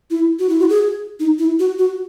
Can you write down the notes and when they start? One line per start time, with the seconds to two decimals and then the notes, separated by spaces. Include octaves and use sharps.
0.11 E4
0.39 F#4
0.49 E4
0.60 F#4
0.70 G#4
1.20 D#4
1.39 E4
1.59 F#4
1.79 F#4